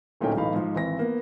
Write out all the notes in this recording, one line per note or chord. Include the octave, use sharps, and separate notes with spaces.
D1 A#2 A3 C#4 D#4 G5
B1 A2 E3 D#4 F5 B5
G#2 F3
G#1 E3 C4 A#6
A#3 B3